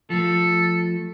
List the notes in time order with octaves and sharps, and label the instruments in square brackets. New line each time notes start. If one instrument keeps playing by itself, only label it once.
[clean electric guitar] F3 A3 [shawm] A4